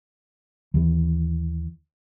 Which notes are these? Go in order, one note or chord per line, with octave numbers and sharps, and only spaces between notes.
D#2 E3